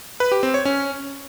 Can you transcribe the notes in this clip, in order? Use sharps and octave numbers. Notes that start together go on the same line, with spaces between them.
B4
G4
C4
C#5
C#4